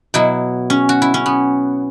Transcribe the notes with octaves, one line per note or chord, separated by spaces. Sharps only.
B2 F#3 E4
C#4
F#4
E4
C#4
B3